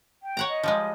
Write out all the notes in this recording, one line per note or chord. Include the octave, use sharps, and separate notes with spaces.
G5
C#5 F#5 A#5
D#5
F3 G3 G#3